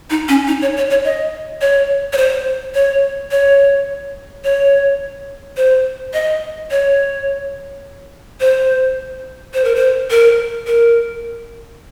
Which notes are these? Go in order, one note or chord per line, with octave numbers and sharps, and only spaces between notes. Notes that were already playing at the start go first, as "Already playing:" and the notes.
D#4
C#4
D#4
C#5
C#5
C#5
D#5
C#5
C#5
C5
C#5
C#5
C#5
C5
D#5
C#5
C5
C5
A#4
C5
A#4
A#4